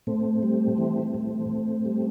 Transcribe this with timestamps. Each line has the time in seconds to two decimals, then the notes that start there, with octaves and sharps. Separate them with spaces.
0.07 A2 A3 C4
0.43 G3
0.78 E3
1.14 A2
1.50 A2
1.85 G3